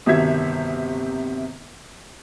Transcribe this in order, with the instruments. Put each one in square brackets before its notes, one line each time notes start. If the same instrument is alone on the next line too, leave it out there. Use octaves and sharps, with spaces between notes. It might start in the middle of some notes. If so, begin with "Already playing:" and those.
[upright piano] G1 C3 D#3 F#4 E5 G#6